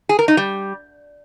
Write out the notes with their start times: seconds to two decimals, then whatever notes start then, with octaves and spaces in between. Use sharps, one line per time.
0.09 G#4
0.19 A#4
0.28 D#4
0.37 G3